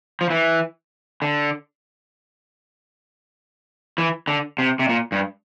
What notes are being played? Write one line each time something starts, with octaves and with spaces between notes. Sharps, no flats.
F3
E3
D3
E3
D3
C3
C3
A#2
G2